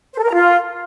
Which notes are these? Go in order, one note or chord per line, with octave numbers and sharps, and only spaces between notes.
C5
A4
A#4
A#5
F4